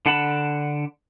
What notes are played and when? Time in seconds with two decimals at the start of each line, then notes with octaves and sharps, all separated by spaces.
0.06 D3 D4 F#5 A5 B5